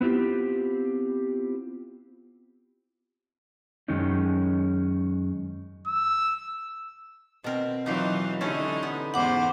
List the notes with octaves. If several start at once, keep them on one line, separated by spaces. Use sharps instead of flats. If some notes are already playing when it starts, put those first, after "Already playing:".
B3 C4 E4 F4 G4
F#2 D#3 G#3 C#4 D#4
E6
B2 C4 A#4
E3 F#3 D#4 F4 G4
D3 G#3 C#4 D#4 E4 A4
B3
E2 G#2 C5 F#5 D6